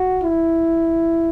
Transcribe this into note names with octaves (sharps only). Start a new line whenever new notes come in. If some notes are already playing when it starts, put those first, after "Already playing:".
Already playing: F#4
E4